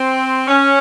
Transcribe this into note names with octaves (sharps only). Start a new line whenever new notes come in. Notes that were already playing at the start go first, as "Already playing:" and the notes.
Already playing: C4
C#4